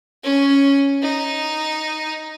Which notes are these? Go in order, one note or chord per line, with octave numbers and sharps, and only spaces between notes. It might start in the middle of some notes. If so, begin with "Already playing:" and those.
C#4
D#4